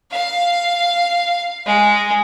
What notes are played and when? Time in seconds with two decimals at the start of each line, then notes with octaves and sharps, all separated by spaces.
0.11 F5
1.66 G#3